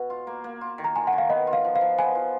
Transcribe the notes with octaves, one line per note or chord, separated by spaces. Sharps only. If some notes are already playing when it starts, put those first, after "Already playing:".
Already playing: B2
F4
A#3
A#3
F4
D#3
A#5
F4 G#5
F#5
D#3
F5
B3 D#5
F4
F5
F3
F5
F3
B3 G#5
F3